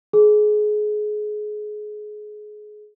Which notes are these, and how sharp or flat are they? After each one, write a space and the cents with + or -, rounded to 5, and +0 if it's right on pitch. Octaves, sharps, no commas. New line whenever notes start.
G#4 +25